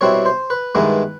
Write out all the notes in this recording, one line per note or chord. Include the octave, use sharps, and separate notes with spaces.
B2 G3 C4 E4 C#5
C5
B4
G2 D#3 G#3 B3 E4